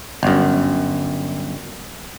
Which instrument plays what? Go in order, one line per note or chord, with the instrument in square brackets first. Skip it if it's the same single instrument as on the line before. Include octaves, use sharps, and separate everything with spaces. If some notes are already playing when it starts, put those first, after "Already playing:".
[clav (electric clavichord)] G1 F#2